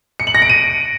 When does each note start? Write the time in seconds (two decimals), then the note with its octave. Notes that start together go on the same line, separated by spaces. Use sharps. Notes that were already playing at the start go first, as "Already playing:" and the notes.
0.20 C#7
0.27 F#7
0.35 A#6
0.42 D7
0.49 D#7